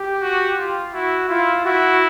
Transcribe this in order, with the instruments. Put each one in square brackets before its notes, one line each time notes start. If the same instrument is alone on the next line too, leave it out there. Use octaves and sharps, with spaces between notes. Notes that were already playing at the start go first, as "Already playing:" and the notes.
Already playing: [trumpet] G4
[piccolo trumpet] F#4
F4
[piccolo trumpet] E4 [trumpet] F#4
[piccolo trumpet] E4 [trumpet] F4
[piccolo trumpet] E4 [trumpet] F#4